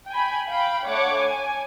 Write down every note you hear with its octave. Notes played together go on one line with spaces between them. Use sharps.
G5 G#5 B5
F5 G5 B5
A3 D4 C#5 F#5 D6
G#5